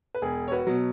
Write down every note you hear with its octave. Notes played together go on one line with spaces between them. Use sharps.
B4
E1 G#4
C#5
F#4 B4
B2 F#3